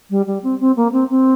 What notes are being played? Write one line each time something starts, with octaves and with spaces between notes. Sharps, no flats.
G3
G3
C4
C4
A#3
C4
C4